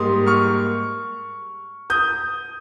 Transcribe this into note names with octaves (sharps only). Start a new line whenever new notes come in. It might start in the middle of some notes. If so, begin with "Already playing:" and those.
Already playing: G#2 G3 A#3 C6 D#6
C#6 F6
D#6 G6